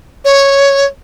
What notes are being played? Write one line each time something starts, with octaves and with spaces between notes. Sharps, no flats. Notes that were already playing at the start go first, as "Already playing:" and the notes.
C#5